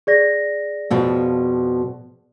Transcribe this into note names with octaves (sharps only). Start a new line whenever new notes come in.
G#4 D5 A#6
F2 B2 F3